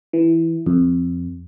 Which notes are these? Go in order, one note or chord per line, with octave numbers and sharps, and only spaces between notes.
E3
F2